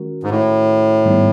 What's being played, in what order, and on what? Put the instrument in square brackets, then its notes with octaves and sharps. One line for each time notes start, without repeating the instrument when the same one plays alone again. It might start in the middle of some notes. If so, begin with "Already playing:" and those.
Already playing: [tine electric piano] D#3 G#3 C#4 F#4 A#4
[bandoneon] G#2
A2
[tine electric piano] G#2 D#3 G3 B3 D#4